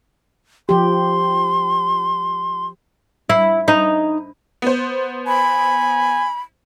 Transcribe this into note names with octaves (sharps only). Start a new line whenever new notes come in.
F3 G4 C6
E4
D#4
B3 C5
G#5 B5